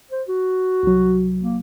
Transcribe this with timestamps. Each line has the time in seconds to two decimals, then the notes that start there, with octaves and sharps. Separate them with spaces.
0.11 C5
0.28 F#4
0.83 C2 F#3
1.42 A#3